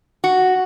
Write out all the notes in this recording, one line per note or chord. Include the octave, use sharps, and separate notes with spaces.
F#4